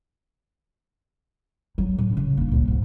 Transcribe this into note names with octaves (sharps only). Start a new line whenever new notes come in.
F#3
A2
C#3
A#3 D4
C#2 A2
G#2 C#3